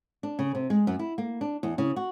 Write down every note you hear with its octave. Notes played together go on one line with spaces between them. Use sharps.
D4
C#3
C3
G#3
F#2
E4
A#3
D4
E2
C#3
F#4